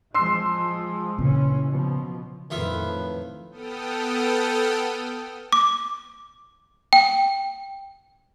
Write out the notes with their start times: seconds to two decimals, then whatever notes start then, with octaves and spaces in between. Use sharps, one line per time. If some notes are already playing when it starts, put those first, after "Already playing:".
0.14 F3 G#3 C6 E6 C7
1.18 A#2 C#3 E3 C#4
1.67 B2 F3
2.50 F2 A2 D#3 F4 B4 E5
3.51 B3 A4 G5 D#6 F6
5.52 D6
6.93 G5